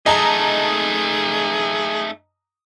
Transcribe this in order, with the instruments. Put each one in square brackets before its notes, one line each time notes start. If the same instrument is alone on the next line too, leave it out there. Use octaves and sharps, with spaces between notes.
[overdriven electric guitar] A3 D#4 [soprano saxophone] G#4 [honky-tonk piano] D#5 A5 A#5